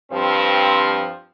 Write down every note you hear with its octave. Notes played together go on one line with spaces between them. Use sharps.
G2 F3 C4